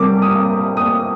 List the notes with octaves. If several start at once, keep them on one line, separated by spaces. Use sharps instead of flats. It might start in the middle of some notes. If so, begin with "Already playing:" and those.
Already playing: C3 G3 A#3 D6
D#6
D#6